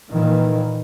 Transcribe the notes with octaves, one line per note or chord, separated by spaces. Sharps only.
A#2 D#3 E3